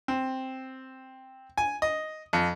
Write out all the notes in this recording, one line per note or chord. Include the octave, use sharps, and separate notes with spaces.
C4
G#5
D#5
F2